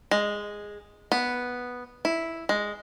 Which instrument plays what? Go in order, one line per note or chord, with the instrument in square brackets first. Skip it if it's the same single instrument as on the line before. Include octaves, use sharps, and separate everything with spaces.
[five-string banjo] G#3
B3
E4
G#3